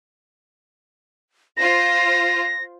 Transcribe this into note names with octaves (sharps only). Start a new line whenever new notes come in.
F4 C5 A#6